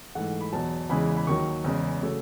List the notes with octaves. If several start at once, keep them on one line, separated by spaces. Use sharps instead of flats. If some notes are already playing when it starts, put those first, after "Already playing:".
G#2 E3 A3 F#5
B5
E2 B2 F#3 A5
E2 C#3 E3 G#3 B5
B5
D#2 D#3 F#3 C#6
E2 C#3 G#3
C#3 F#3 A3